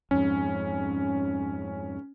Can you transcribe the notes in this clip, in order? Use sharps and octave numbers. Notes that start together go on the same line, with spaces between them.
F2 G#2 C#4